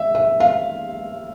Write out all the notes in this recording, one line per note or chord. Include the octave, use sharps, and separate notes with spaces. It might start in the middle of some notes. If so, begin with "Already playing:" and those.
Already playing: E5
E5
F5